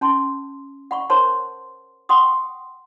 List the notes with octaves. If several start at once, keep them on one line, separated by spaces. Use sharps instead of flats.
C#4 A5 C6
F#5 B5 C#6
A#4 C5 C#5 A5 C6
F#5 G5 C6 C#6 D#6